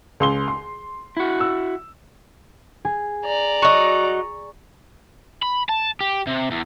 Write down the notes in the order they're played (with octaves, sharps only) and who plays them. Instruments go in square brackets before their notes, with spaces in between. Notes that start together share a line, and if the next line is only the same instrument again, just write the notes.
[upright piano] C#2 C6 G7
C6
[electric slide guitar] E4 F#4
[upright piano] E6
[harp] G#4
[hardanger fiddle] D5 A#5
[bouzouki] F#3 D#4 [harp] C#6
[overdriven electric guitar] B5
A5
G4
C3
E2